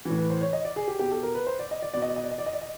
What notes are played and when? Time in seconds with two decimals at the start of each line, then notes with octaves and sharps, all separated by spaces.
0.05 A2 E3
0.18 B4
0.30 C5
0.41 C#5
0.53 D#5
0.65 D5
0.76 G#4
0.88 G4
0.99 B2 G4
1.12 A4
1.23 A#4
1.35 B4
1.47 C5
1.59 D5
1.71 D#5
1.82 D5
1.94 B2 D5
2.02 D#5
2.08 D5
2.16 D#5
2.24 D5
2.31 D#5
2.38 D5
2.46 D#5
2.53 D5
2.61 D#5